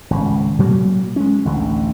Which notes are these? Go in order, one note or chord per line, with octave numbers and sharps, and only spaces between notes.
G#1 C#2
A#2 F#3 G3 A#3
G#3 C#4
A1 D2 D3